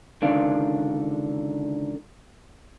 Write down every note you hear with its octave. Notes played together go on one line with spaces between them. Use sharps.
C#2 D3 D#3 D4 F5